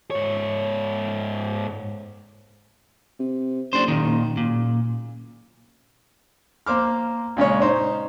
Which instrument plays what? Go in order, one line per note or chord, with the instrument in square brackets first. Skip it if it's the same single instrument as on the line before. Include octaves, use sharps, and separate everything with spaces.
[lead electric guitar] G#2 C#5
[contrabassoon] C3
[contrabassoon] F#1 [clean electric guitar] D4 C5
[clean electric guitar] A#2 D#3
[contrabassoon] F#1 [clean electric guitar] A#2
[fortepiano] A#3 C5 D6 F6
A#2 C#3 G#3 C#5
D#4 C5 C#5